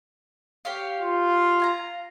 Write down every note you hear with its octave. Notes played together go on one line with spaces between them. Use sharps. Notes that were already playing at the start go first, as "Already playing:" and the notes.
G4 C#5 F5
F4
F5 G#5 A#5